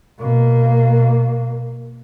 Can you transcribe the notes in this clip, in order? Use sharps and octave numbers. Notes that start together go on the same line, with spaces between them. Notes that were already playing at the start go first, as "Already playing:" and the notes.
B2 A#3